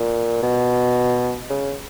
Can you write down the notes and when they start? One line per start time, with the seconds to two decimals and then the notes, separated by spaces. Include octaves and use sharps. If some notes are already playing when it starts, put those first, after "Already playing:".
Already playing: A#2
0.43 B2
1.50 C#3